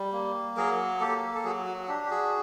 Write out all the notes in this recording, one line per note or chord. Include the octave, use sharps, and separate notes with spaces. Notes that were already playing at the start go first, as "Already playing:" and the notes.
Already playing: G3
A#3
F#3 G#4 A#4
A#3 G4 A4
A4
F#3 F#4 G#4
F#4
D4 G4
G4
F#4 G#4